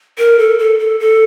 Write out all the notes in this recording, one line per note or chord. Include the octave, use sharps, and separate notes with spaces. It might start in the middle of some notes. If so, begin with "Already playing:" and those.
A#4
A4
A4
A4
A4